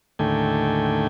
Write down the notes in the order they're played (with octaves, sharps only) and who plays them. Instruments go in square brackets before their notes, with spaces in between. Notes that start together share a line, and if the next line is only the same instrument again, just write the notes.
[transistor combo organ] D#2 A2 D3 A3 G5 G#5